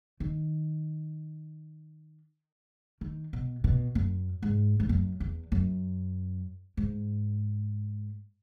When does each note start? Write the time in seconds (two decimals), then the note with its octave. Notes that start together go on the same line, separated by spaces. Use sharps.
0.20 D#3
3.01 D#3
3.33 B2
3.64 B2
3.95 F#2
4.43 G#2
4.80 G#2
4.89 F#2
5.20 E2
5.52 F#2
6.77 G#2